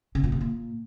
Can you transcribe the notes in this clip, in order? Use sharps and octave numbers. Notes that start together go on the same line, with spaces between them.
C#3
A#2
C3
A#2